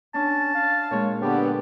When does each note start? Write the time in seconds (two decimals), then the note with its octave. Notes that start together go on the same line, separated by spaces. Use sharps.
0.14 C#4 D4 A5
0.54 F5
0.91 A#2 G#3 C#5
1.22 D3 B3 G4